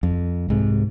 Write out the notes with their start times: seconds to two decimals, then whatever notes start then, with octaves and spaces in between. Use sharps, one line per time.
0.03 F2
0.49 C2 G#2 C3